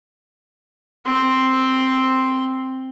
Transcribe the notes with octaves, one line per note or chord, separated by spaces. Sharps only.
C4 C6